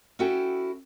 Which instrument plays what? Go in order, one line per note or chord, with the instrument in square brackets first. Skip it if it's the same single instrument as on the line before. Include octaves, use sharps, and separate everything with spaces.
[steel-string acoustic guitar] C#4 E4 F#4 A4 G5